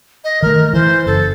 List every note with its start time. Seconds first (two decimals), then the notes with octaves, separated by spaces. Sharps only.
0.24 D#5
0.42 D#3 A3 A#4
0.73 E3 C5
1.06 F#1 A4